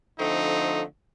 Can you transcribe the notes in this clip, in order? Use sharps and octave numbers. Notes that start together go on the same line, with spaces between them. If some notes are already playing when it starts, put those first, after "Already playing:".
D3 F3 A3 C4 D#4